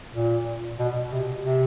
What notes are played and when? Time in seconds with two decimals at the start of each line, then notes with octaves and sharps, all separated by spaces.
0.14 A#2
0.79 B2
1.12 C3
1.44 C3